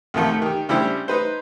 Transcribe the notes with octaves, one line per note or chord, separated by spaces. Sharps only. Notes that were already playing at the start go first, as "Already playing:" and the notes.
D2 C3 D#3 F3 A3 A#3
D#3 G4
C#3 G3 D4 E4 G4 C5
D#4 B4 C5